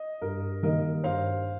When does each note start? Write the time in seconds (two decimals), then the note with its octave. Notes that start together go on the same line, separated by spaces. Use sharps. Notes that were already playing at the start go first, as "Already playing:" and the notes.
Already playing: D#5
0.21 G2 A#4
0.63 D#3 G3 A#3 A#4 D#5
1.04 G2 C5 F5